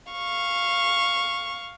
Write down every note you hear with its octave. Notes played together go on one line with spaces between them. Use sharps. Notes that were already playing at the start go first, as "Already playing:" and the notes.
F5 C#6